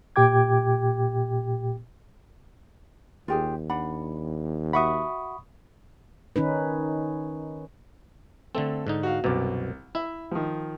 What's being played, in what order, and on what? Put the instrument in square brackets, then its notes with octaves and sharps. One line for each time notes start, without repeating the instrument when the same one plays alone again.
[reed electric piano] A#2 G4 G5 D6 G#6
[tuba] D#2 [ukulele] F4 G4 G#4
[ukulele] D4 F#5 B5
[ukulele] F#4 E5 F#5 [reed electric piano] B5 C#6 D#6
[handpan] D#3 C#4 D#4 B4
[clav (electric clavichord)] D3 A3 C4 [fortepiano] A4
[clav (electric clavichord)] G#2 D3 D#4
[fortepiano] F#4 F5
[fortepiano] C2 D6 [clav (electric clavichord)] F#2 B2
[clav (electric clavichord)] E4 [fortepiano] E5
[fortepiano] D#3 F3